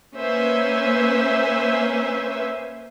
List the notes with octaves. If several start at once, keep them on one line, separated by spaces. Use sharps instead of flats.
A#3 C#4 B4 C5 E5 G#5